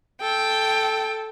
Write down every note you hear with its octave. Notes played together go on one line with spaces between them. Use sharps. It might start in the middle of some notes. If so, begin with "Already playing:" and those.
A4 G5